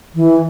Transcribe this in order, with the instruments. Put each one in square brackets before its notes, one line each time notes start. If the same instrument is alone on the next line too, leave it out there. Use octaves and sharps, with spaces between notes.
[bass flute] E3